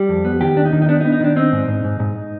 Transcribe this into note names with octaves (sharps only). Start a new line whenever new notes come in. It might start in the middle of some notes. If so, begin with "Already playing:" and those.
Already playing: G3 G4
F2
B3
D#3 G4
D#2 D4
D#4
D#3
D#4
B3 D4
D#4
B3
D#4
D#3 D4
C4 D#4
G#2
G#2
G#2
G#2